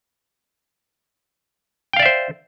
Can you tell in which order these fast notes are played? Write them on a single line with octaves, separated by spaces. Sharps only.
G5 F5 D5 E5 C5